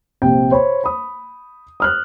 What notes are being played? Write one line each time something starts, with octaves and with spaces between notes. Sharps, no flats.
A#1 C3 G5
C5 C#5 B5
B5 D#6
D#6 F6 F#6